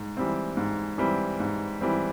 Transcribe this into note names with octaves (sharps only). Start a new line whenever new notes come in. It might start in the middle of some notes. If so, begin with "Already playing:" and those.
Already playing: G#2
E3 G3 C4
G#2
E3 G3 C4
G#2
E3 G3 C4